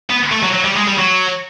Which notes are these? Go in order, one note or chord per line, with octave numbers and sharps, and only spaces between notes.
B3
A3
F#3
F#3
G3
G#3
G3
F#3